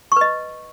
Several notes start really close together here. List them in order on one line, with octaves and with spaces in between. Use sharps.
C#6 B4 D#5